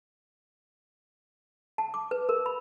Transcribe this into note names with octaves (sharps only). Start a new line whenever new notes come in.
A5
D6
B4
A#4
B5